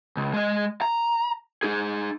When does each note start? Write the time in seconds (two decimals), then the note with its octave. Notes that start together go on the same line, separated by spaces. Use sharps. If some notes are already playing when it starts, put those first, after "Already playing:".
0.17 C#2
0.34 G#3 D#5
0.82 A#5
1.63 D#4 G#4